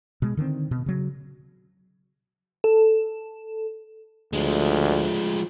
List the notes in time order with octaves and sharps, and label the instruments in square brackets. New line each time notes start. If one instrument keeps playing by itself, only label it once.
[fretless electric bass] B2 G#3
D3 D#3 B3 C4
B2
C#3 F#3
[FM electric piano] A4
[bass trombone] D2 [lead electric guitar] F3 G#3